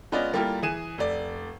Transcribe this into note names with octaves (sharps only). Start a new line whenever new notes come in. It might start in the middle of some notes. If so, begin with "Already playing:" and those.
G#3 B3 C#4 F4 D5 D#5
G3 A#3 E4 F4 G4 A4
E3 G#4 D#7 E7
F1 A3 D5